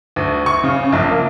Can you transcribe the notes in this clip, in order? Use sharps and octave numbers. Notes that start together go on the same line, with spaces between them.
D2
C#6
C#3
A#1
A#3